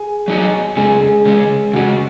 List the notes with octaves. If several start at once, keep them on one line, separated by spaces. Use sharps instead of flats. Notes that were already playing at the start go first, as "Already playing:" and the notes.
Already playing: G#4 G#5
F#3 D#4 F#4 D#5
C#3 G#3 C#4 G#4 G#5
G#4 G#5
C#3 G#3 C#4
C#3 G#3 C#4 F#4 F#5